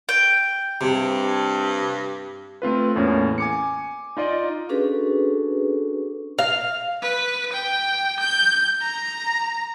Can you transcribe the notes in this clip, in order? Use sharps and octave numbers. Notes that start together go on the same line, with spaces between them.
G5
G2 C3
A3 C4 F4 B4
E2 A2 A#3 C#4
G#5 D6 C#7
D#4 F4 D5 D#5
C#4 D4 F#4 G#4 A4 B4
F5
B4
G5
G6
A#5